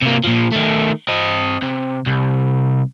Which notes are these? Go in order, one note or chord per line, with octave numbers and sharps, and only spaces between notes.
C3 A#3
A#2 F3
D#3 A3
C4 D#5
C3
C2